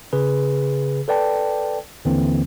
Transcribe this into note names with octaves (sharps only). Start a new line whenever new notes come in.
C#3 G#4 B4
A4 B4 D5 G5 A5
D#2 D3 E3 A#3 C4